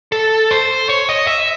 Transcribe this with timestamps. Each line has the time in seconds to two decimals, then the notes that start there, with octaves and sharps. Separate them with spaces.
0.12 A4
0.51 C5
0.89 C#5
1.09 D#5
1.27 E5